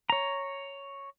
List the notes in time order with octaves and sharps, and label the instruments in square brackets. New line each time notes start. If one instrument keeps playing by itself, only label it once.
[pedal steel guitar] C#5 A#5